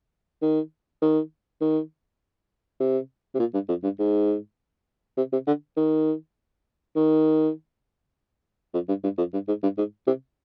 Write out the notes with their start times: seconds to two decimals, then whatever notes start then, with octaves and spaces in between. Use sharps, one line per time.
0.42 D#3
1.02 D#3
1.61 D#3
2.80 C3
3.35 C3
3.40 A#2
3.54 G2
3.69 F2
3.84 G2
3.99 G#2
5.17 C3
5.33 C3
5.47 D3
5.77 D#3
6.96 D#3
8.74 F2
8.88 G2
9.04 G2
9.18 F2
9.33 G2
9.48 G#2
9.63 G2
9.78 G#2
10.07 C3